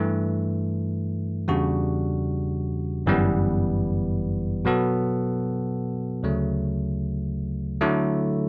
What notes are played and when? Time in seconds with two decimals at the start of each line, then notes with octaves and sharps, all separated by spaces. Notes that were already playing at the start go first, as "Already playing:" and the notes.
Already playing: G2 E3 A3
1.48 E2 C#3 G3 D4 F#4
3.06 G1 F#2 E3 G3 B3
4.65 B2 F#3 B3 F#4 A4
6.23 D2 C#3 F#3 A3
7.81 D3 F#3 A3 E4